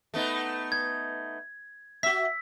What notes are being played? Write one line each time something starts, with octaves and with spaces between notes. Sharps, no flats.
A3 B3 D#4
G#6
F#4 E5 E6 B6